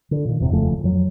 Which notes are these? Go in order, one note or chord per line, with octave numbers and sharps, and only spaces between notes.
D3
A#2 D#3
E1 E2 G#2 C3
D#1 F2 C#3 A3
F2 F#3